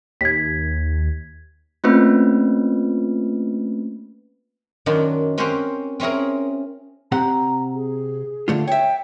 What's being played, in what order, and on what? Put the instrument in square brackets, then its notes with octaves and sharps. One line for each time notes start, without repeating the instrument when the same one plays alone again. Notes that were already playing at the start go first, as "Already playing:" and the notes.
[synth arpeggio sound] D#2 [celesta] G#6 B6
[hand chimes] A3 A#3 C4 C#4 F4 B4
[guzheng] F#2 D#3 F#3 A#3 D4 F4
C4 C#4 F#4 G4 A#4 C5
C4 C#4 E4 G#4 A#4
[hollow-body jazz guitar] C3 C4 F#5 [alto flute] A#5
[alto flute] G#4
[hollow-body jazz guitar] D3 A3 F4
[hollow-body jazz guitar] C#5 E5 [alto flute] G5